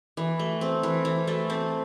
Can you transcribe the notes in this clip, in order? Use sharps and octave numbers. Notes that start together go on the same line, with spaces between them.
E3
A3
C4
E3
E3
A3
C4